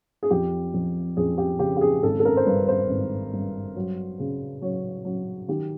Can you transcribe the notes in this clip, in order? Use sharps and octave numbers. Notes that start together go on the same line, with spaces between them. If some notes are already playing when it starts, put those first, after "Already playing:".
G#4
F2 G4
F2
F2 G#4
G4
C#3 G4
G4
G#4
G#1 A4
A4
A#4
C5
G2 B4
C5
G#1
G2
F#3
C#3
F#3 C#5
F#3
D#3 G4